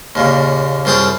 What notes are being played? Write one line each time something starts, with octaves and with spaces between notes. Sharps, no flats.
D#2 A#2 C#3
C2 F#2 C4 G#4 A5 B5